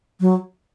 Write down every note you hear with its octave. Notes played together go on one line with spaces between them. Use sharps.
F#3